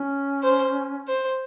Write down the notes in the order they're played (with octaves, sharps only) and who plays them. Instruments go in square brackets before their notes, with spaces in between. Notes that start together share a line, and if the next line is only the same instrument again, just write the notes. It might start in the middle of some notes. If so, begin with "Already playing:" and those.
Already playing: [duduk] C#4
[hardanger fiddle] C5
C5